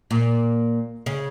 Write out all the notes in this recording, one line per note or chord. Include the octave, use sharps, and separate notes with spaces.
A#2
C#3